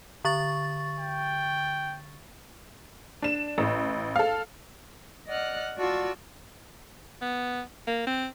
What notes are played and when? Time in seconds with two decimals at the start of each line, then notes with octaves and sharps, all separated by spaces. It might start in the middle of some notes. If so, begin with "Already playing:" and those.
0.25 D3 C#6 A6
1.00 G5
3.22 D4 E7
3.58 A1
4.16 A4 F5
5.28 D5 D#5 F#5 F6 F#6
5.78 F4 F#4 D5 A5 C#6 E6
7.22 B3
7.87 A#3
8.07 C4